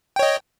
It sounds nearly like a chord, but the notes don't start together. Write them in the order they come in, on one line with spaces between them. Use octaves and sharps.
G5 C#5 D#5